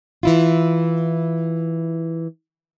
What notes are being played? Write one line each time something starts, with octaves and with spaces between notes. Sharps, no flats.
E3 E4 F4